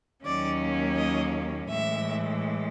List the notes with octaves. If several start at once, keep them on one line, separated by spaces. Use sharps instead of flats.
D#2 D#3 F#3 A#3 C#4 D5
D#5
A2 E3 G#3 E5